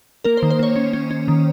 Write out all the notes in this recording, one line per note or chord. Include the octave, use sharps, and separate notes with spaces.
A#3 A#4
C5
D#3
C5
A#3 C#5
C#4
C#4
C#4
D#3